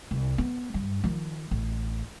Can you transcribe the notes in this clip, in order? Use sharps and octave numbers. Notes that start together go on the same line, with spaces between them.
C2
B3
G2
D#3 F3
A1